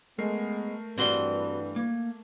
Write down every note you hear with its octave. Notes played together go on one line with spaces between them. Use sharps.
G#3 A3 B3 A#4 C7
G2 E3 G3 C4 F#4 C6
A#3